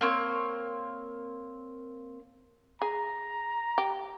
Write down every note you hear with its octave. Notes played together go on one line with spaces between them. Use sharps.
A#3 C4 C#5
G#4 A#5
G4